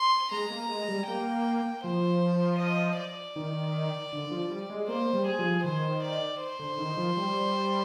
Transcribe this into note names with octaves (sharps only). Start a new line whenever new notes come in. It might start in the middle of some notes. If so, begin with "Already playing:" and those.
Already playing: C6
G#3 A#5
A#3
G#3
G3
A#3 G5
F3 C5
D#5
D5
D#3
D3
F3
G3
G#3
A#3 C5
G3
G#4
F3
D#3 C5
D5
C5
D3
D#3
F3
G3